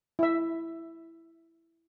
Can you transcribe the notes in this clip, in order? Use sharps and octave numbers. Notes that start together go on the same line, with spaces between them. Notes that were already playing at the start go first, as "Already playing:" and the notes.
E4 E5